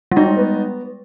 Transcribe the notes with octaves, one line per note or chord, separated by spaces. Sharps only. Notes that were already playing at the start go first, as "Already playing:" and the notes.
G3
G#3 D#4
B3